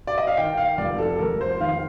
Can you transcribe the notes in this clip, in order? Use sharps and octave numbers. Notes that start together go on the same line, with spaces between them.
D5
D#5
F5
D#3 G5
F5
F1 D5
A4
F1 A#4
C5
D#3 F5